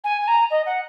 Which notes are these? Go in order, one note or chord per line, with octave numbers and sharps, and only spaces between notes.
G#5
G#5
A#5
D#5
F#5